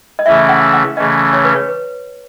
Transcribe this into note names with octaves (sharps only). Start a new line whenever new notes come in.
D#5
C#3 E3 A3 C#4 E4 E5
F#5
F#5
C#3 E3 A3 C#4 D#5
C#5
B4
C#5
B4